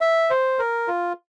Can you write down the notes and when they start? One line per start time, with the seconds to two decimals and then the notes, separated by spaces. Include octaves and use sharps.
0.01 E5
0.30 C5
0.59 A#4
0.88 F4